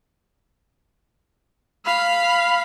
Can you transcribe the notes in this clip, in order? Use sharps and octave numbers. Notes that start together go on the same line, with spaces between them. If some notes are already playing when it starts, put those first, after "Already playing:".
F5 B5